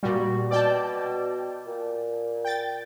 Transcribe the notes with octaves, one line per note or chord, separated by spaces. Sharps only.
A#2 G3 F#4
B2 D5 G5 A5
A#2
G5 A6